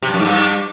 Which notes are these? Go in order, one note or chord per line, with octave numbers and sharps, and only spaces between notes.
C3
G2
F#2
G#2
G2